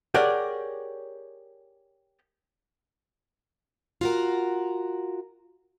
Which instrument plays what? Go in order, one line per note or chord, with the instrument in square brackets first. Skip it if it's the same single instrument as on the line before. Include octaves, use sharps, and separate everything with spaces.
[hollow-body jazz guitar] G4 G#4 A#4 C#5 D5 F#5
[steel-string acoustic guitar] F4 F#4 A#4